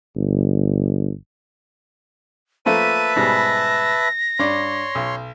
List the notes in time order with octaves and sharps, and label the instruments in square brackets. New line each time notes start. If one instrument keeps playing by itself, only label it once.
[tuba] G1
[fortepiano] F3 A3 A#3 [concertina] B4 E5 A5 [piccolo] D#7
[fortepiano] G#2 B2 G3 [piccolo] A#6
[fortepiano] G2 D5 [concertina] C#5 C6
[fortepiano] B1